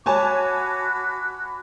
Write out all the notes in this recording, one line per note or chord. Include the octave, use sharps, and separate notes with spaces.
F#4 C#5 G#5 A5 B5 D6